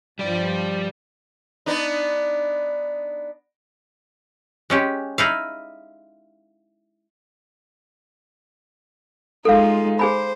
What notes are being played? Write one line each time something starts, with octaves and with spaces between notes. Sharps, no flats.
G2 F3 G3 D5
B3 D4 D#4
G#3 C#4 G4
D#4 E4 F5
G#3 D#4 F4 A4 F5
G#4 C5 G#5 B5